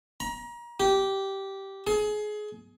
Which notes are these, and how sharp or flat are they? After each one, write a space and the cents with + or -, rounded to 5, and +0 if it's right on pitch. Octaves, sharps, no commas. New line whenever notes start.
A#5 +30
G4 -10
G#4 +25